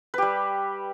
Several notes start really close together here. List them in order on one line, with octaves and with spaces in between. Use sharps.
B4 G4 G3